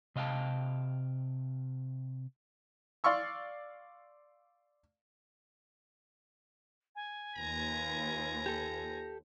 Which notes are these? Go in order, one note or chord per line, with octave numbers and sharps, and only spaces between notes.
C3 D#5 F5 G5 A5
D5 F5 C6 C#6 E6
G#5
D#2 F4 B4 A#5
G4 A4